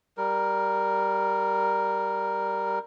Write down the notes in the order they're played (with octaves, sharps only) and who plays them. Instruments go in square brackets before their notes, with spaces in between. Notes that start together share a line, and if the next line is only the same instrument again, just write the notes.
[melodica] G3 A#4